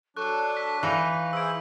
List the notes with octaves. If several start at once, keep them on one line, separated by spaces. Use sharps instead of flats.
F#3 D4 A4 C#6 F#6
B6
E3 D#4 F5
E4 G#4 C5 E6 D7